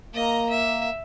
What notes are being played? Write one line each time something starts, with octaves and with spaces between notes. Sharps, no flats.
A#3 D#5 A#5
E5